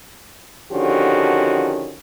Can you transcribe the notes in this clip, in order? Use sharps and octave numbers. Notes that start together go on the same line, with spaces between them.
D3 D#3 F3 C#4 F#4 G4